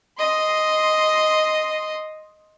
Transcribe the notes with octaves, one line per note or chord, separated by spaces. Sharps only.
D#5 C6